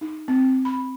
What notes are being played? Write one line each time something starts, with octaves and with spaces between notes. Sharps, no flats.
D#4
C4
B5